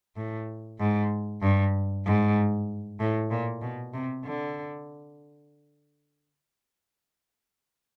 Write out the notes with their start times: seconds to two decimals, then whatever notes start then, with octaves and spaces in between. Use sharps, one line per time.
0.16 A2
0.79 G#2
1.42 G2
2.05 G#2
3.00 A2
3.31 A#2
3.62 B2
3.93 C3
4.25 D3